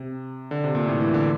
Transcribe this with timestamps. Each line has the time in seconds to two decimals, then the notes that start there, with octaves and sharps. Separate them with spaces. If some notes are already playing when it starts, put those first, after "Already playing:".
Already playing: C3
0.51 D3
0.64 C3
0.75 A#2
0.87 A2
1.00 E3
1.14 D3